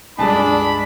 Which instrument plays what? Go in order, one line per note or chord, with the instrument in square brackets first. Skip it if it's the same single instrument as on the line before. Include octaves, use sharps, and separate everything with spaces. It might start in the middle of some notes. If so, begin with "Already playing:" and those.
[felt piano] C#2 G2 G#4 [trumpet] D4 [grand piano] G#5 A5 D#6 [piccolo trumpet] B5